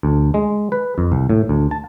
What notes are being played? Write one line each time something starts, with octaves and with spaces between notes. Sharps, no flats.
D2
G#3
B4
F2
C2
A2
D2
A5